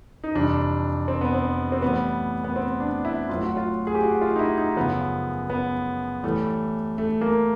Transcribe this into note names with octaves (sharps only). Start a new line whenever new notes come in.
D#4
F2 C3 E3 G3 D4
C4
B3
C4
C4
A2 E3 G3 B3
B3
C4
D4
E4
A2 F#3 F4
F#4
F4
G#4
G4
F#4
F4
D#4
E4
D#4
F#2 C#3 F3 B3
B3
A2 E3 G3 A3
A3
A#3